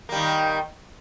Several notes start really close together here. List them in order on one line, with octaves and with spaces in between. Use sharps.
A#3 G3 D#3